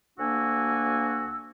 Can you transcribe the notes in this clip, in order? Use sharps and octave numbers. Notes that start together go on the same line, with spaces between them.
D2 A#3 D4 F#4 G#5 E6